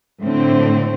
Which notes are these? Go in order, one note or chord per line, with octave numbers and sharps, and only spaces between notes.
A2 D3 C4